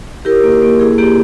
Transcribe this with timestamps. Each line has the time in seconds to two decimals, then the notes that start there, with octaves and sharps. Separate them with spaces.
0.25 E4 G4 A#4
0.43 A#3
0.62 A#3
0.80 E4 G#4
0.98 A#3 G4